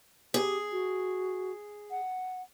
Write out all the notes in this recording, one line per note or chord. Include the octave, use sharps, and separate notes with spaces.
G4 G#4
F#4
F#5